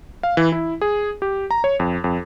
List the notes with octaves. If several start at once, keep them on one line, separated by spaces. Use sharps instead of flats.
F5
E3
E4
G#4
G4
A#5
C#5
F2
F2